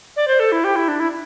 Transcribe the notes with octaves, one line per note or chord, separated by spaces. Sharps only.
D5
C5
A4
E4
G4
E4
D4
E4